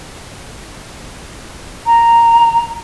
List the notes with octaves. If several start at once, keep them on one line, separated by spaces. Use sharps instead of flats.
A#5